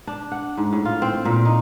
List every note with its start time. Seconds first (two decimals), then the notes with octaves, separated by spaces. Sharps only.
0.07 D4
0.32 F#5
0.57 G#2
0.73 A2
0.85 F4
1.02 C4
1.25 A#2
1.45 D#4